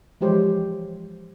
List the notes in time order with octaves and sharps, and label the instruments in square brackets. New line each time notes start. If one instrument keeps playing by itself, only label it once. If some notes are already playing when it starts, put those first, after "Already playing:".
[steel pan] E3 F3 G#3 G4 C5 C#5